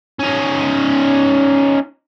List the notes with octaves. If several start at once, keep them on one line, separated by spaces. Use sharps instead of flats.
C#4 D#4